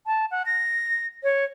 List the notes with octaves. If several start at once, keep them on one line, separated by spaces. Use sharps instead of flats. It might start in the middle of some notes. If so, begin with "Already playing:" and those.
A5
F#5
A#6
C#5